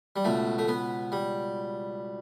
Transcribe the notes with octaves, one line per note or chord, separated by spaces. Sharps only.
G3
C#2 B2 A3
A3
B3
G3